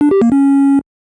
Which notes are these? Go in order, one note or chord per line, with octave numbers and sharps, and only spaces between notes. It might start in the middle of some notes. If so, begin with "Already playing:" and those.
D4
G4
A#3
C#4